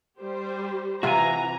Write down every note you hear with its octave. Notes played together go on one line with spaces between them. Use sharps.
G3 G4 C5
C3 E3 F4 F#4 G#5 A#5